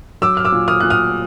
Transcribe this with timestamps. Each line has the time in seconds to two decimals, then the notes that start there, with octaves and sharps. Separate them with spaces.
0.22 F#3 D6 E6
0.37 F6
0.45 D6 E6
0.52 A#2
0.68 D#6 F6
0.80 A#2 F#6
0.90 D#6 F6